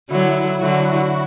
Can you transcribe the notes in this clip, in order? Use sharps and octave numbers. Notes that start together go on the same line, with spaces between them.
D3 F#3 E4
D3 F#3 F#4